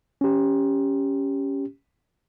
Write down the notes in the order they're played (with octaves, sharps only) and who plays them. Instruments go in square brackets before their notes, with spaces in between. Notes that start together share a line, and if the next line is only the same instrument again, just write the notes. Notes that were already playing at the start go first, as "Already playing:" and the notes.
[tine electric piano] C#4 G4